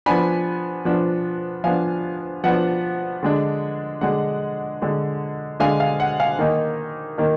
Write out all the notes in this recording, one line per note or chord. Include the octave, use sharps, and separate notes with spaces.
F3 B3 D4 G#5 B5
F3 B3 D4
F3 B3 D4 F5 G#5
F3 B3 D4 F#5
D3 G#3 D4
D3 G#3 D4 F#5
D3 G#3 D4
D3 G#3 D4 F5 G#5
F5
F#5
F5 G#5
D#3 A#3 D#4
D#3 A#3 D#4